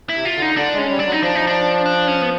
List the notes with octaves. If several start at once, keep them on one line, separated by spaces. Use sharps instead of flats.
E4
C3
F4
D3
D#4
D3 D4
G#3 C#4
G3
D4
F#3
D#4
F3 D4
D#4
D4
D4
C#4
B3